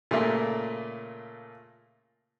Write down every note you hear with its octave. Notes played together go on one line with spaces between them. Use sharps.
A#2 C#3 A3 A#3